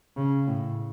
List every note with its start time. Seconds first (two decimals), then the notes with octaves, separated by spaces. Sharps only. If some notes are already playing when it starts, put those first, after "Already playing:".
0.17 C#3
0.47 A2